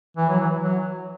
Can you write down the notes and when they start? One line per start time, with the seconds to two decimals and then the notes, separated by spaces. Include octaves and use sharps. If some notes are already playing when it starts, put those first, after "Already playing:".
0.17 E3
0.29 F#3
0.40 E3
0.62 F#3